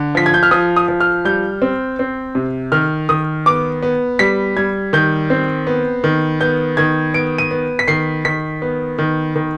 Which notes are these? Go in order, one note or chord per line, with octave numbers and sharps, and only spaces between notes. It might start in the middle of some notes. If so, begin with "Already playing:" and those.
Already playing: D3
F3 B6
G#6
G6
F6
F3 D#6
D#6
F3
F6
G3 G6
C4
C4
C3
D#3 F6
D#3 D#6
B3 D6
B3
G3 B6
G3 G#6
D#3 G6
C4
B3
D#3
B3 G6
D#3 G#6
B3 D7
D#7
B3
B6
D#3 C7
D#3 B6
B3
D#3
D#3